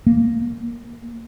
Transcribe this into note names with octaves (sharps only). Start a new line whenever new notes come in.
A#3